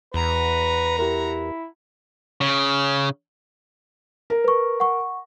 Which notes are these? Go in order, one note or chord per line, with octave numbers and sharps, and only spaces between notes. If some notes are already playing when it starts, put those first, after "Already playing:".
E2 F#4 B4 A#5
E4 G4 A#4
C#3
A#4
B4 C#6
F#5 C#6